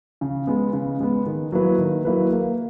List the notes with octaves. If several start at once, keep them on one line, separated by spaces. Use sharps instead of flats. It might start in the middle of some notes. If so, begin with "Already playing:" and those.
C#3
G#3 B3
C#3
G#3 B3
D#3
F#3 A#3 E4 B4
D#3
F#3 A#3 E4 B4
A#3